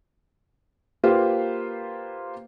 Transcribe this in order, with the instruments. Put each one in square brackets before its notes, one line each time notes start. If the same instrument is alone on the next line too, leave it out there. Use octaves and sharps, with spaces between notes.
[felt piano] A#3 F4 G4 B4 C5 F5